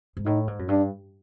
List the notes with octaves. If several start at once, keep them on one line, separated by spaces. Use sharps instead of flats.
G#2
A2 D#4
G#2
F#2
G2 D4